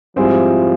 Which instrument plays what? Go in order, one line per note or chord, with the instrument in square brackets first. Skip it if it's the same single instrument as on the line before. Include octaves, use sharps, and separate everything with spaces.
[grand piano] G#2 G3 C4 E4 G#4 [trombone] F3